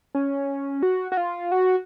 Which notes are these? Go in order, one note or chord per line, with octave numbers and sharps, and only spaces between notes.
C#4
F#4
F#4
F4
F#4